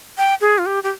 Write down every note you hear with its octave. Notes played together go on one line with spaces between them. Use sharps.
G5
G#4
F4
G4
G4